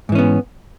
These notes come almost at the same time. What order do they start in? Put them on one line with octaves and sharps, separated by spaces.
G#2 E3 C#4 B3